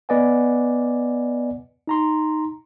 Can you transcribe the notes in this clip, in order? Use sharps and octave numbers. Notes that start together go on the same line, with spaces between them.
B3 B4 D5 D#5 F#5 G#5
D#4 A#5 C6